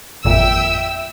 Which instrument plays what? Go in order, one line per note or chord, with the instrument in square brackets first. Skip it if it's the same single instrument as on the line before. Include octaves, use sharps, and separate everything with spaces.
[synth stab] G#1 F2 A#2 [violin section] E5 G5 E6